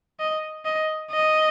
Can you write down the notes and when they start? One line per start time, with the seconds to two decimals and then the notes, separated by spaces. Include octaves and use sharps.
0.19 D#5
0.65 D#5
1.11 D#5